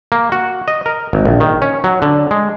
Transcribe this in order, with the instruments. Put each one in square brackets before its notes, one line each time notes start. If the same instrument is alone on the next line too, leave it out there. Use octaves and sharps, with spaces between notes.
[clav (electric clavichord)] A#3
F#4
D#5
A#4
G#1
A#1
D#3
C#4
F#3
D3
G#3